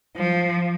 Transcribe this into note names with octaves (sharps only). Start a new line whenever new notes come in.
F3